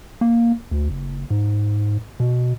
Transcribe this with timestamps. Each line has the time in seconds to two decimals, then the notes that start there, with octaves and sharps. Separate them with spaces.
0.21 A#3
0.71 D2
0.90 F#1
1.30 G#2
2.20 B2